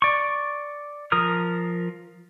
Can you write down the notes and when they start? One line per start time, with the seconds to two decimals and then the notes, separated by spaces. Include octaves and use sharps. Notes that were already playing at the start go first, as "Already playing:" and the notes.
0.02 D5 C#6
1.12 F3 A#4 D#6 F6